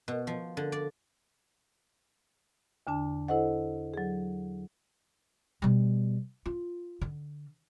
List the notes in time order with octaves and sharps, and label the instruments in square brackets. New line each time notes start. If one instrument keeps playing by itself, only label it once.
[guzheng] B2
F3
D3
D5
[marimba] E2 D3 D4 A5
E4 A4 C5 D#5 F#5
F#3 G#4
[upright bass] B2 G3
F4
D3